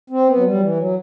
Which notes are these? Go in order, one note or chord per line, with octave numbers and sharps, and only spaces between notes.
C4
B3
F#3
G3
F#3
E3
F#3